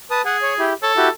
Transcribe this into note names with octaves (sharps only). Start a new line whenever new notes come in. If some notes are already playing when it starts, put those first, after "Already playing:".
B4 A5 D#6
G#4 F#5
C#5
E4 G4
A4 C#5
E4 F#4 G4